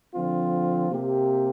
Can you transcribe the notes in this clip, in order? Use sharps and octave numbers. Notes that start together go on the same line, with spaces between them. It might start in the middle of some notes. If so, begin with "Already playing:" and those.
D3 F3 C4 F4
C3 A#3 G4